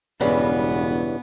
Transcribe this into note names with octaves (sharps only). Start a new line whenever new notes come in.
E1 G2 C#3 E3 B3